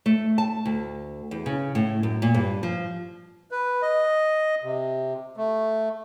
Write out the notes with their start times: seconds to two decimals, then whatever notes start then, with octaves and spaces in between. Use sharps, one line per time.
0.06 A3
0.38 A5
0.65 D2
1.31 E2
1.46 C#3
1.75 A2
2.03 F#2
2.22 A#2
2.34 G2
2.63 F3
3.51 B4
3.82 D#5
4.63 C3
5.37 A3